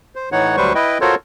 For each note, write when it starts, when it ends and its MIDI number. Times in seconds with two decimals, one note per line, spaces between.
0.15 0.29 72
0.32 0.56 45
0.32 0.56 52
0.32 0.56 63
0.32 0.56 73
0.32 0.56 78
0.57 0.73 38
0.57 0.73 54
0.57 0.73 55
0.57 0.73 71
0.57 0.73 72
0.57 0.73 85
0.75 0.98 64
0.75 0.98 71
0.75 0.98 75
0.75 0.98 79
1.01 1.15 65
1.01 1.15 66
1.01 1.15 69
1.01 1.15 70
1.01 1.15 72
1.01 1.15 73